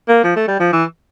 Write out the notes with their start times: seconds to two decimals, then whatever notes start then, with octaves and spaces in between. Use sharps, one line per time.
0.08 A#3
0.24 F3
0.36 A3
0.48 G3
0.60 F3
0.73 E3